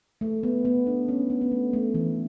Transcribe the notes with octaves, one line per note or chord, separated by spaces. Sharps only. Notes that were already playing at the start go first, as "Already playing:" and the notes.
A3
B3
B3
D4
C#4
B3
B3
A3
A3
E3